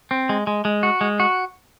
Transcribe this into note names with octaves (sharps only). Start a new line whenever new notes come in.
C4
G#3
G#3
G#3
F#4
G#3
F#4